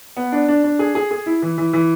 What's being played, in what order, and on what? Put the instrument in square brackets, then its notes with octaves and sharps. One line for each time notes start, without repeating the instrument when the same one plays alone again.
[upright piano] B3
D4
D4
D4
G#4
G#4
G#4
E4
E3
E3
E3